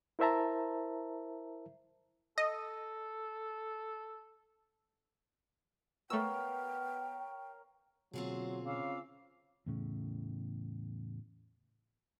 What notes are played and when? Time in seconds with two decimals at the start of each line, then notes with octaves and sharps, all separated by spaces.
0.19 E4 A#4 C5 E5 A5 A#5
2.38 A4 D#5
6.10 A3 B3 A#4 C#5 F5 G5 E6
8.13 B2 D3 F#3 A#3 C4 F4 G#4
8.65 C#3 F5 D6 E6
9.66 E2 A2 C#3